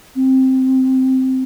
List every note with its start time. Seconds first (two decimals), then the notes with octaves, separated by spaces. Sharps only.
0.16 C4